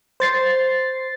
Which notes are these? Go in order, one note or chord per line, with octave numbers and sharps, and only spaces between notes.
C5 A6 C7